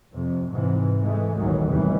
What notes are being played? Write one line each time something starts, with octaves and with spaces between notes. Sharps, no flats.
F2 C3
G#2 C3 E3
E3 G#3 A3
G1 D2 A#2 D#3 E3 F#3
E2 A2 C3 D#3 E3 G3